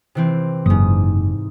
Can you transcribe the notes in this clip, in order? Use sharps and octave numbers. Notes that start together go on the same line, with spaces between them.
C3 E3 C4
F#1 G#2 D#6